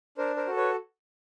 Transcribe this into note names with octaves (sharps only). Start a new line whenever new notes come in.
D4 A#4 C5
A#4 C5
F#4 A4
B4 C#5